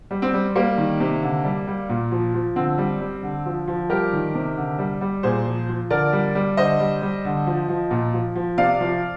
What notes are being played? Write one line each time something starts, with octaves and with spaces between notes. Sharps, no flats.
G3
C4
G3
G3 A#3
D#3
C3
D3
G3
G3
A#2
F3
F3
D3 C4
G3
G3
D3
F3
F3
G3 G4 A#4
D#3
C3
D3
G3
G3
A#2 G#4 C5
F3
F3
D3 A#4 D5
G3
G3
D3 C5 D#5
G3
G3
D3
F3
F3
A#2
F3
F3
C3 D5 F5
F3